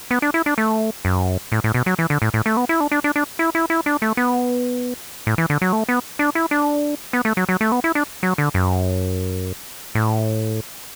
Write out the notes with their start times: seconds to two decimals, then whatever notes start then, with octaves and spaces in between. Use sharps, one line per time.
0.11 B3
0.22 D4
0.34 E4
0.46 D4
0.58 A3
1.05 F#2
1.52 A2
1.64 A2
1.74 B2
1.86 F#3
1.99 E3
2.10 D3
2.22 A2
2.34 A2
2.46 A3
2.57 B3
2.69 E4
2.80 D4
2.92 D4
3.04 D4
3.16 D4
3.39 E4
3.55 E4
3.70 E4
3.86 D4
4.02 A3
4.17 B3
5.27 A2
5.38 E3
5.50 D3
5.62 F#3
5.73 A3
5.89 B3
6.19 D4
6.35 E4
6.51 D4
7.13 B3
7.25 A3
7.37 F#3
7.49 F#3
7.61 A3
7.72 B3
7.84 E4
7.95 D4
8.23 F#3
8.38 D3
8.54 F#2
9.95 A2